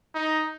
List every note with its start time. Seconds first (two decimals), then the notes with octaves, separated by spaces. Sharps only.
0.14 D#4